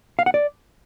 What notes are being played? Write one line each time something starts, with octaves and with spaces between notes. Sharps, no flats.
F5
F#5
D5